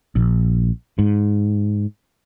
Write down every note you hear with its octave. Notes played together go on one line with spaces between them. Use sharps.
A#1
G#2